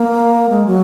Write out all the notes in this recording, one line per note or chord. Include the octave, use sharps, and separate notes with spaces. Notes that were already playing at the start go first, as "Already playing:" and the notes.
Already playing: A#3
G#3
F#3